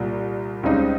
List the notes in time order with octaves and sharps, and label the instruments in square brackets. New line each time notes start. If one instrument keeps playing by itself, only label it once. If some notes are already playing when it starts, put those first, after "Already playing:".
Already playing: [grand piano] C2 A#2 G3
C#2 C#3 G3 C4 D#4